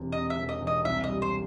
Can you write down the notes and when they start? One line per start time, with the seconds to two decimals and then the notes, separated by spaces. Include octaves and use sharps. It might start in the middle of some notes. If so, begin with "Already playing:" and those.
Already playing: E1 E2 C3
0.12 C3 D#5
0.30 E5
0.36 E1
0.49 D#5
0.61 E1
0.67 D#5
0.85 C2 E5
1.04 D#5
1.10 G3
1.22 C5